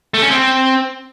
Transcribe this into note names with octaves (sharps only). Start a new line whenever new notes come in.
A3
C#4
C4